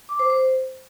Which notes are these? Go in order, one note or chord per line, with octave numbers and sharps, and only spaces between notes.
D6
C5
C5